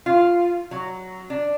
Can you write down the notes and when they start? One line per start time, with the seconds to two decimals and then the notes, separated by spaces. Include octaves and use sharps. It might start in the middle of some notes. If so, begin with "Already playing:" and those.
0.06 F4
0.71 F#3
1.30 D4